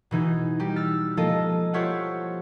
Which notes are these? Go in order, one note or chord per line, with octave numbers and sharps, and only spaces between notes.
B2 E3 D#4 G#4
G3 D#4 G4
E6 F6 A6
F3 G#3 A#3 F4 A4 D#5
F4 G4 C5 C#5 E5 F#5